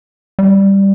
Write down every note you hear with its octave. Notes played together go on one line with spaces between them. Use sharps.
G3